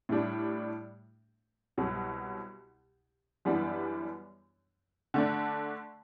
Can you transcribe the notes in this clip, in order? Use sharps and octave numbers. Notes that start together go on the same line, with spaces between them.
A2 G3 D4
C2 B2 F#3
F#2 E3 G3 B3 D4
D3 A3 D4